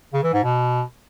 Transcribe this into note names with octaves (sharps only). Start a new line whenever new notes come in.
C#3
E3
G#2
B2